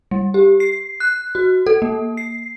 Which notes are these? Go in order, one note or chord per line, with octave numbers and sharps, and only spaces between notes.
G3
G4
C7
F#6
F#4
A4
A#3
C7